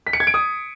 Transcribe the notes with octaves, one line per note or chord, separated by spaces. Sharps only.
B6
C#7
G#6
D7
D#6